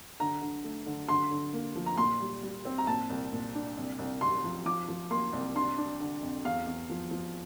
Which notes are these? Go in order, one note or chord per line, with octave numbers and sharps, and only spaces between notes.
D3 A#5
D3
A3
D3
D3 C6
D3
A#3
F3
A#5
A#2 C6
G3
G3
C4
A#5
A#2 A5
C2
A#2
D4
C2
C2
C3 C6
F3
F3 D6
F3
A#3 C6
C2
D4 C6
D4
D3
F2
E2 F5
E2
F3
F3